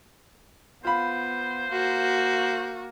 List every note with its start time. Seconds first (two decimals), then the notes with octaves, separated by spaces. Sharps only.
0.85 B3 F4 C5 B5
1.73 A#3 F#4